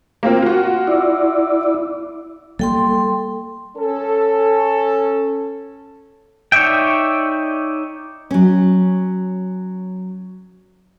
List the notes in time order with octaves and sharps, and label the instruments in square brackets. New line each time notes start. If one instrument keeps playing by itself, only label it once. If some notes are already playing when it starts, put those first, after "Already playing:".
[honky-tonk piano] A#3 C4 F4
F4 F#4
[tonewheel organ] E4 D5
[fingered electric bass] G3 A#3 [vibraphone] A4 G5 C6
[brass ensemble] C#4 A4
[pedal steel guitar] D#4 C#5 D5 E5 G5
[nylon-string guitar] F#3 C#4